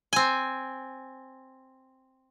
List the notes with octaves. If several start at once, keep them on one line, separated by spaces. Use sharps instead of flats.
C4 G#5